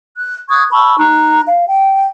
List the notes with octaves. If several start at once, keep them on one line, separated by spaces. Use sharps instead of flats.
F#6
C#6 D#6 F#6 G#6
A5 B5 C#6 E6
D#4 A#5 F#6
F5
G5